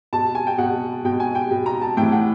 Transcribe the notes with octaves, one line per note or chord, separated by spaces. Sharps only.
B2 A5
G#5
G5
B2 F#5
B2 G5
G#5
G5
B2
A#5
A5
A2 E3 G5
F#5